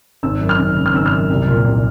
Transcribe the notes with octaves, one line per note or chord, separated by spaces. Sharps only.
G#1 E6
F#2
F6
G#1
C#3
F6
G#1 E6
F6
F#2
C2
A#2
C2